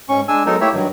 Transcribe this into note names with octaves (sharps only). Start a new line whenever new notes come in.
G#2 C#4 C#6
G#3 D4 G#5 E6
F#3 G#3 B3 D#4 A4 A#4
A3 A#3 E4 G4 C#5 E5
G2 D#3 F#3 G3